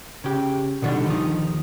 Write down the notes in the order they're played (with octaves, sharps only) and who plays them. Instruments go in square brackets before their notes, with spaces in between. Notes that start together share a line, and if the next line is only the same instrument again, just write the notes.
[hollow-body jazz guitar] C#3 G4
B2 D3 D#3 G3 D4
D#2 D#3 F3 D#4